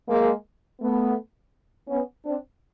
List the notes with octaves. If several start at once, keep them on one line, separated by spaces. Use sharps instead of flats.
G#3 A#3
A3 B3
B3 C#4
C4 D4